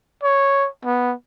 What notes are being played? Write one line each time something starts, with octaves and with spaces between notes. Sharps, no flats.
C#5
B3